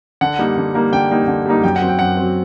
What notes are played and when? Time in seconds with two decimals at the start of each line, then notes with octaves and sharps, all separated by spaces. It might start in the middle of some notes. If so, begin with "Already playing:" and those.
0.21 D3 F#5
0.39 G3 A#3 D#4
0.57 D3
0.74 G3 A#3 D#4
0.92 D3 G5
1.11 G3 A#3 D#4
1.27 D3
1.46 G3 A#3 D#4
1.63 F#2 G5
1.76 F#5
1.82 F#3 C4
1.88 G5
1.99 F#2 F#5
2.17 F#3 C4